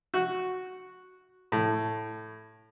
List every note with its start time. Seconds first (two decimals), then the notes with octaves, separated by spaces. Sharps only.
0.14 F#4
1.52 A2